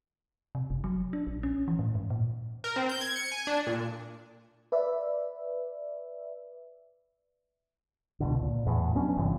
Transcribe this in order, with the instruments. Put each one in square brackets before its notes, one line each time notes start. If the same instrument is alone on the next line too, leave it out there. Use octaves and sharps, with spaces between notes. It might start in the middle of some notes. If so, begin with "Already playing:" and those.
[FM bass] C3
F#1
F#3
D4
A#1
C#4
E3
A2
G#2
A#2
[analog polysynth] A#4
C4
G6
G#6
C#7
G#5
D4
A#2
[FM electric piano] B4 D5 E5
[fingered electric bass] C#2 B2 D3
A#2
E2 A2
F#3 B3 C#4 D4
G1 G2 C3 E3